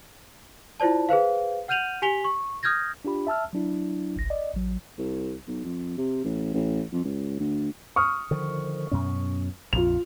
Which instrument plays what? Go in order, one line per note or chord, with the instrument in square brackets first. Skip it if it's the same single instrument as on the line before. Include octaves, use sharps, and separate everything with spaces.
[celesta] E4 F4 C5 D5 A5
G#4 B4 C5 F5
F#5 F6 G6 D#7 F7 F#7
G4 G#5 B6 F7 G7
C#6
D#6 F6 G6 G#6 A#6
[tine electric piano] D4 F4 G4 B5
E5 A5 E6 F6
F#3 D4 E4
G1 C2 A#6
D5 D#5
A1 F#3
[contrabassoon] C2
B1
F2
C3
A1
A1
F2
C#2
D2
[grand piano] C#6 D#6 F6
[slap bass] D3 D#3 F3
F#2 B2 C#4
[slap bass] A#1 F2 [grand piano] F4 F7